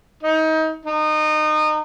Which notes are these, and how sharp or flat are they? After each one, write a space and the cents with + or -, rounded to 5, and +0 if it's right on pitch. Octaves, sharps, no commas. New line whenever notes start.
D#4 +30
D#4 -25